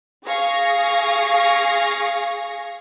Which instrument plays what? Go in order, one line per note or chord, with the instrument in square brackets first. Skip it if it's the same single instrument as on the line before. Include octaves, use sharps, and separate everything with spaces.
[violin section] G#4 F5 C#6 A#6